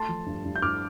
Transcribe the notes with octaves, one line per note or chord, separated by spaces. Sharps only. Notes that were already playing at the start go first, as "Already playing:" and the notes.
Already playing: A3 A5 C6
F3
G2
G2
G6
G2 D6 F6